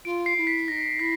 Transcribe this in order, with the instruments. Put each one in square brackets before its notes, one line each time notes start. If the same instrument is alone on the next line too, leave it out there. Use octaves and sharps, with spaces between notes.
[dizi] F4 [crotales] D7
[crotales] C7
[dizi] E4
[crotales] B6
[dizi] D#4 [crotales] A#6
[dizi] E4 [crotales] B6